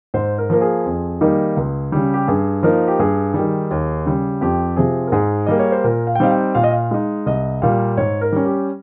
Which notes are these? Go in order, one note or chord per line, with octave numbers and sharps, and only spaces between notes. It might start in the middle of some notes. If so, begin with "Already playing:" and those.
G#2 C5
A#4
F3 A#3 A#4
G#4
F2
D#3 G3 A#3 D#4
C#2
C#3 G3
G4
G2 G#4
F3 A#3 D#4 A#4
G4
G2 G#4
D#3 G3
D#2
C#3 G3
F2 G4
C3 F3 G#4
A#4
G#2 G#4
G3 A#3 D#5
C#5
C5
A#2 A#4
F5
G5
G3 C4 D#4 F5
G5
A#2 F5
D#5
F5
G#3 D#4
C2 D#5
A#2 G3 A#3 F5
G#2 C#5
A#4
G3 C#4
G4